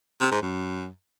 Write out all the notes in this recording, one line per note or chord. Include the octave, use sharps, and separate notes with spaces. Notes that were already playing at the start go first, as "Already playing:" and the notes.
C3
G#2
F#2